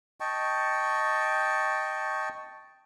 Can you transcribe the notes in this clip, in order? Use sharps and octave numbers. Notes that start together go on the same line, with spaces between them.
D#5 G5 A5 C#6